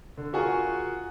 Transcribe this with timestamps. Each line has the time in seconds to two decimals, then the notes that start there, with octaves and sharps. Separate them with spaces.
0.17 D3
0.33 F4 F#4 G#4 A#4 C#6